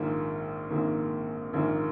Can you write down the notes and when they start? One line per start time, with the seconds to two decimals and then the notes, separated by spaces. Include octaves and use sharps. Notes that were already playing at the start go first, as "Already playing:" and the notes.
Already playing: A#1 G#2 D#3 A#3
0.70 A#1 G#2 D#3 A#3
1.53 A#1 G#2 D#3 A#3